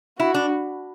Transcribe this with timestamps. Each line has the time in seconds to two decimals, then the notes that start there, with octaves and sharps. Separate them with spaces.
0.19 E4 F#4
0.34 D4